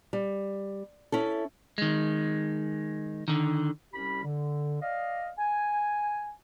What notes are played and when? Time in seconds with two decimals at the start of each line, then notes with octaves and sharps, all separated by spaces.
0.13 G3
1.12 C#4 E4 A4
1.78 D#3 G#3
3.28 D3 D#3
3.93 C2 G3 C#4 G4 B5
4.24 D3
4.82 D5 D#5 F5
5.39 G#5